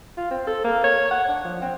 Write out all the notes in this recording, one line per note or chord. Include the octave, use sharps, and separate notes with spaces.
F4
C4
A4
A#3
C#5
F#5
D4
F3
C4